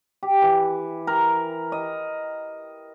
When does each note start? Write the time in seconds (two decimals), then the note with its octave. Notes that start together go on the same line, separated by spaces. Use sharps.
0.23 G4
0.42 E3
1.07 A#4
1.72 D#5